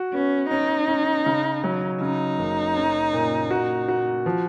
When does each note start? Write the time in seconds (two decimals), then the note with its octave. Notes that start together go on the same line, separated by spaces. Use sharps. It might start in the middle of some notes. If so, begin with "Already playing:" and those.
Already playing: F#4
0.14 B3 C#4
0.51 C#4 D#4
0.88 C#4
1.26 C#3
1.64 F#3
2.01 C#3 D#4
2.39 F#1
2.76 C#4
3.13 A#2
3.51 F#4
3.88 F#4
4.26 F3